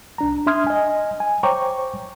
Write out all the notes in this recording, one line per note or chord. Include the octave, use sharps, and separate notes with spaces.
C2 D4 A#5
D4 E5 C6 D#6 F6 G#6
D#5 G#5
G#5
C5 C#5 G5 A#5 C#6 D6